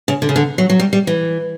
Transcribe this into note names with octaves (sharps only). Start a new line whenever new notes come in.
C#3
D3
C#3
D3
F#3
F#3
G3
G3
E3